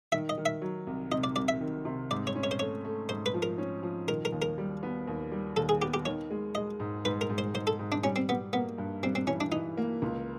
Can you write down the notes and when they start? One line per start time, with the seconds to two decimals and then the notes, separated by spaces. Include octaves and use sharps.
0.12 D#3 E5
0.29 D#5
0.38 D#3
0.46 E5
0.62 F#3
0.87 C2
1.12 C3 D#5
1.24 D5
1.36 C2 D5
1.48 E5
1.61 D#3
1.85 C3
2.11 G#2 D5
2.27 C#5
2.35 C#4
2.44 C#5
2.51 C5
2.59 A3 C#5
2.85 A3
3.09 G#2 C5
3.26 B4
3.34 F3
3.42 A#4
3.58 C#4
3.83 F3
4.08 D#3 A#4
4.25 A#4
4.32 D#2
4.42 A#4
4.58 G3
4.83 B3
5.08 D#2
5.32 G3
5.57 D#2 A4
5.69 G#4
5.81 B3 G4
5.94 G4
6.05 D#3 C#5
6.30 G#3
6.55 G#3 D#5
6.80 G#2
7.05 G#2 B4
7.21 A#4
7.30 G#2
7.38 C5
7.54 G#2 C5
7.67 A4
7.79 G#2
7.92 D4
8.04 G3 C#4
8.16 C4
8.29 G3 B3
8.53 A#3 B3
8.78 G2
9.03 G3 C4
9.15 C4
9.27 E3 C#4
9.40 D4
9.52 E3 D#4
9.77 A#3
10.02 C#2